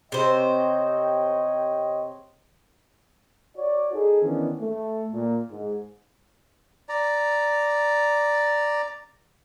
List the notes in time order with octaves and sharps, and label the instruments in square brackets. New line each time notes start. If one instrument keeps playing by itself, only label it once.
[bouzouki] C3 C5 [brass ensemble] C#5 D#5 G5
[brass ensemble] F#4 C#5 D5
D#4 G#4 A4
D#3 E3 B3 C#4 D4
A3
A#2
G#2
[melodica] D5 A#5